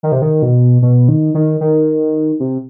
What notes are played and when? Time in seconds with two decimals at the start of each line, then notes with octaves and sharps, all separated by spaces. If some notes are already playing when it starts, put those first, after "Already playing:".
0.03 D#3
0.12 C3
0.22 D#3
0.42 B2
0.82 B2
1.09 D#3
1.34 D#3
1.61 D#3
2.40 C3